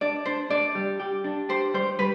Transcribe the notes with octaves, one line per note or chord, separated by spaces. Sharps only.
D4 D5
D4 C5
D4 D5
G3
G4
D4
G4 C5
G3 C5
G3 B4